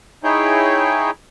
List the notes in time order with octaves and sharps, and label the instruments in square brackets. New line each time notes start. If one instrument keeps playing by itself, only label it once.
[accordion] D#4 E4 G#4 C#5 G5